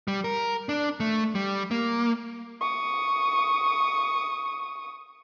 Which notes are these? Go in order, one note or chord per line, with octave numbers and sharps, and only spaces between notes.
G3
A#4
D4
A3
G3
A#3
C#6 D#6